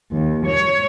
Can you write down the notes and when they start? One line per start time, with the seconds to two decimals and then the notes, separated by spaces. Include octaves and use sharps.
0.12 D#2
0.46 C#5